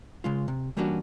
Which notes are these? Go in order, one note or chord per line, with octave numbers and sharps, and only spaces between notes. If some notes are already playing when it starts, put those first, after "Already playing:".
C#3 G#3 F4
C3
E3 G3 A#3 C#4 D4 F#4